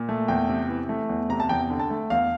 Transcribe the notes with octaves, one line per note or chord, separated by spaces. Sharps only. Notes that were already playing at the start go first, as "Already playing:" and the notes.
Already playing: A#2
A3
E2 G5
C3
E3
A3
E2
C3 A#5
A5
E2 G5
D3
A5
A3
E2 F5